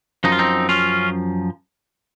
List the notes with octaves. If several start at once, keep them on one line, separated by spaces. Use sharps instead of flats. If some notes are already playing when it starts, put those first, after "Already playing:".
F#2 F3 D#4
F4
C4 D#4
C#4 F4